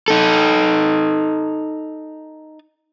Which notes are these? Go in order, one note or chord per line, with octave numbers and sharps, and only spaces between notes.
D#4 A4